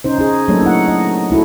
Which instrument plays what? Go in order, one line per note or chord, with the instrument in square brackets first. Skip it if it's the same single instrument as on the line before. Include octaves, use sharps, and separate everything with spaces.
[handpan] C#4 D#4 C5
D#4 G#4
F#3 A3 A#3 D4 A4 C#5
D#4 E4 F#5
D#5
D#4 E4 F#4 A4